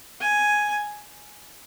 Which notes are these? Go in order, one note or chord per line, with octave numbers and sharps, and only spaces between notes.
G#5